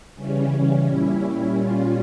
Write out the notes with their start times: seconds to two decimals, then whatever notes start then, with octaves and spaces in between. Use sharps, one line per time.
0.15 C#3 E3 G3 C#4
0.86 A#2 G3 C#4 E4
1.56 A#2 G3 C#4 F4